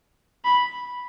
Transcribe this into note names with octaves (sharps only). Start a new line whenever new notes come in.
B5